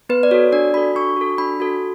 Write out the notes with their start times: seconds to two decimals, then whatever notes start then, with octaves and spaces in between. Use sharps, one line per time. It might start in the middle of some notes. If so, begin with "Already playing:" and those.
0.09 B3 B4
0.23 D5
0.31 F#4 A4 C#5
0.52 D4 D5
0.74 F#4 A4 B5
0.96 D4 C#6
1.17 F#4 A4
1.38 D4 B5
1.60 F#4 A4